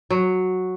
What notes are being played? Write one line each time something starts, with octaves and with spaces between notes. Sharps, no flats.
F#3